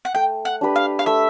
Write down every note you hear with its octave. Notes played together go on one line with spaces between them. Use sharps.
F#5
A3 G5
F#5
D4 G4 B4
F5
F5
A3 E5